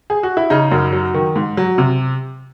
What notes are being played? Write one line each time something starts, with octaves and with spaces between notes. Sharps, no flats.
G#4
F#4
E4
C#3 D#4
F#2
F#3
D#3
G#2
F#3
C3